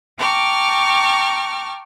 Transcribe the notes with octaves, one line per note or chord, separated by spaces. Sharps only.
G5 A5 A#5 C#6 D6 F6